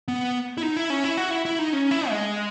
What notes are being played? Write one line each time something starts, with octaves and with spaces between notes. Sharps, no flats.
B3
E4
D#4
E4
C#4
E4
F#4
E4
E4
D#4
C#4
E4
G#3